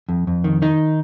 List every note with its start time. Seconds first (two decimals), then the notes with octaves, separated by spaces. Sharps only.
0.09 F2
0.27 F2
0.44 D#3
0.62 D#3 D#4